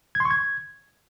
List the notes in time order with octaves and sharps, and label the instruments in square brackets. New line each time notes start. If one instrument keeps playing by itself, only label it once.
[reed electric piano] G#6
C6
C#6
G#6